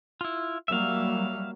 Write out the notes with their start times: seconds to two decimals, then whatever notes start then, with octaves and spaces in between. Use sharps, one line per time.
0.21 E4 F4
0.68 F#3 G3 A#3 E5 F5